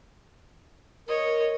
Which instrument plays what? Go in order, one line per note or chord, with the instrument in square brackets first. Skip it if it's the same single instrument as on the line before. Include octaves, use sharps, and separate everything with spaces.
[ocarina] A#4 [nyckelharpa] C#5 D#5